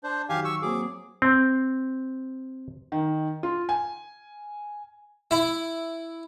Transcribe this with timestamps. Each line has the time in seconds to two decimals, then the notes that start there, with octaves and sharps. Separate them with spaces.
0.04 D4 C5
0.29 D#3 F#3 G4 F5 G#5
0.44 C#6 E6
0.62 F#3 A#3 C4 G#4 D6
1.22 C4
2.92 D#3
3.43 F4
3.69 G#5
5.31 E4